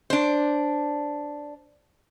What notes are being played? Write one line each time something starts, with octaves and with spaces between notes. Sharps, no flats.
D4 C5